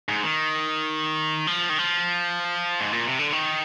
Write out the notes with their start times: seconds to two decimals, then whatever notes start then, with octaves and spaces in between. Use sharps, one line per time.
0.08 G#2
0.23 D#3
1.47 F3
1.69 D#3
1.78 F3
2.80 G#2
2.93 A#2
3.07 C3
3.19 D3
3.33 D#3